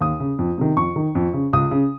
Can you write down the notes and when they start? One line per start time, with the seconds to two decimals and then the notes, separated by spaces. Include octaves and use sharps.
0.01 D#2 D#6
0.20 C#3
0.39 F2
0.58 C3 D#3
0.76 F2 C#6
0.96 D#3
1.15 F2
1.33 C#3
1.53 C#2 D#6
1.71 C#3